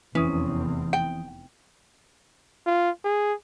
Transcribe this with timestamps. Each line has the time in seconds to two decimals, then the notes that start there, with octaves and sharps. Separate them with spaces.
0.15 F1 E2 E3 C4 C#4 D#6
0.93 G5
2.66 F4
3.04 G#4